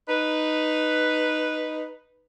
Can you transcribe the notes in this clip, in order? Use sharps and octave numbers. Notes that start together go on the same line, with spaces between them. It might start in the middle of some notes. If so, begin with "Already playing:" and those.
D#4 B4